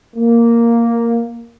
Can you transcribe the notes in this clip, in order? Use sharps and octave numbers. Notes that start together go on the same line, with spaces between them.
A#3